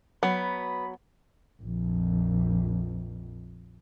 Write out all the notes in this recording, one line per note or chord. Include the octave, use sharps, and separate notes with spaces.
F#3 B3 B5
A#1 F2